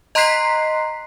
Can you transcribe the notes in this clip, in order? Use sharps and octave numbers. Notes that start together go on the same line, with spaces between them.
D#5 A#5 C6 F#6 B6 C7